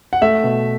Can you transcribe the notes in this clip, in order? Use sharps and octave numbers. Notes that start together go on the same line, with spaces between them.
F#5
A3 E5
B2